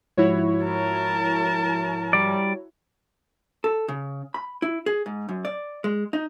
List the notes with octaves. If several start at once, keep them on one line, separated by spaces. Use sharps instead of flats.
G#2 F3 E4 F#4 C#5
A#4 A5
G3 D5
A4
C#3
B5
E4
G#4
G#2
F#2
D5
G#3
D#4